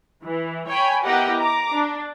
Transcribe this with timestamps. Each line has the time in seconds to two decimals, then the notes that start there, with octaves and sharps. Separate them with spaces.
0.23 E3
0.67 C#5 G5 G#5 B5
1.05 B3 E4 G4 A#4 D#5 F#5
1.38 A#5 D6
1.72 D4